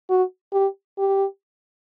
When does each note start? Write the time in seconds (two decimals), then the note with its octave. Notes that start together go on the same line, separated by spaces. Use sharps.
0.10 F#4
0.53 G4
0.98 G4